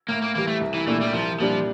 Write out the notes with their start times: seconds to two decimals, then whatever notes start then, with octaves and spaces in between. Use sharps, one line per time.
0.08 A2 A#3
0.22 A#3
0.35 E3 G3 A#3
0.47 A3
0.61 C2
0.74 E3
0.87 A#2 E3 A3 D4
1.01 G3
1.13 C2 F3
1.40 A#2 F3 G3 D4